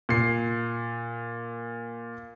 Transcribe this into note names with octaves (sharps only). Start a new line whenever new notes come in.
A#2 C7